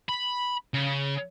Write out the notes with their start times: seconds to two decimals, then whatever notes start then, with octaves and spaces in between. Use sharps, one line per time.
0.09 B5
0.74 C#3